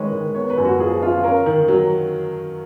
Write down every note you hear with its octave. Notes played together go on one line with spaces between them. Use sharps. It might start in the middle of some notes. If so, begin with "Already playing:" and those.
Already playing: D#3 G#3 B4 C#5
D#3
B3 C#5
B4
F#2
F#4
F3 G#4
F4
C#4 A#4
D#3
F#3